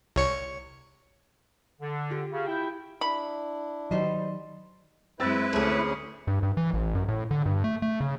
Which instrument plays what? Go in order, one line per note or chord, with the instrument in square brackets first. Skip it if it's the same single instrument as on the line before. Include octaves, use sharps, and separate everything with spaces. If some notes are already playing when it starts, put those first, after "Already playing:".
[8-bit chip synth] C2 C#5 C#7
[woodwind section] D3
[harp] F4 G4
[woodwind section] C#3
E4 G5
[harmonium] D4 E4 [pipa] B5
[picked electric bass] D#3 F#3 [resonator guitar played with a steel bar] G3 C5 D#5
[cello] F#2 G#3 [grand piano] C4 E6 A6 [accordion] E4 B4
[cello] D2 C#4 [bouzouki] A2 G#4
[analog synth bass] G2
G2
E3
A1
F#2
A2
D3
G2
A3
A3
C#3